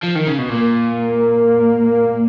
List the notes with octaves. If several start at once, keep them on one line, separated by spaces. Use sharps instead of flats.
F3
D#3
C#3
B2
A#2 A#3